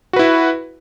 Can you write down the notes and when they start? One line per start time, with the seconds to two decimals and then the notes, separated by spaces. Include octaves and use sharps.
0.13 F#4
0.16 B4
0.19 E4